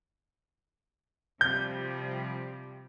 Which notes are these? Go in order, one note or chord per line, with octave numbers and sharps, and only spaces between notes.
C3 F3 G3 G6